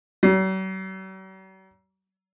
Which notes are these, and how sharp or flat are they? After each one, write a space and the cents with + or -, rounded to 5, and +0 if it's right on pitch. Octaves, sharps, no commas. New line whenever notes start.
F#3 +45